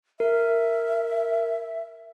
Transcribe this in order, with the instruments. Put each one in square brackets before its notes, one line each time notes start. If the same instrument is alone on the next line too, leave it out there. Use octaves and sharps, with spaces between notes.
[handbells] A#4 [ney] E5